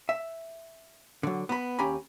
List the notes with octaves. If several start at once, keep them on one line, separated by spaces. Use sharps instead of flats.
E5
D3 F#3
B3 B5
D#2 C#4 G4 G#5 A#5 B5